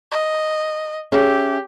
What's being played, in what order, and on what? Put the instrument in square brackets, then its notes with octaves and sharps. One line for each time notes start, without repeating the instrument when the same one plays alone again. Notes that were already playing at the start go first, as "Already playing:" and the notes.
[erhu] D#5
[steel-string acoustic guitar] C#4 G#4 E5 [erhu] G4